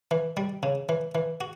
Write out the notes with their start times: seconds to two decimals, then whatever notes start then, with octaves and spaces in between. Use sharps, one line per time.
0.11 E3
0.37 G3
0.63 C#3
0.89 E3
1.15 E3
1.41 F#4